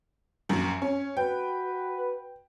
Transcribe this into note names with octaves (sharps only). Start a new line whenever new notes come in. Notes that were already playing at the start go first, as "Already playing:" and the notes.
A#1 F#2
C#4
F#4 B4 G5